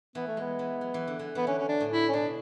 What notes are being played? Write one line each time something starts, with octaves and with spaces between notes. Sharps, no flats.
E3 B3
A3
G#3 B3
E3
F#3
E3
D3
E3
E3 B3
D3 C#4
C#4
D4
A2
E4
C#4
B2 D4